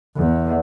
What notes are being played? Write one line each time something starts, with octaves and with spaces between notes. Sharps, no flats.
E2